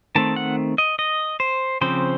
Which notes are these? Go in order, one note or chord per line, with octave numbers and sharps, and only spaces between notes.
D#3 A3 C4 A5
F#5
D#5
D#5
C5
C#3 F3 C4 C5